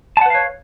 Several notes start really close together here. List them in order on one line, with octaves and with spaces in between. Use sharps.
A5 F#5 B4 F5 C#5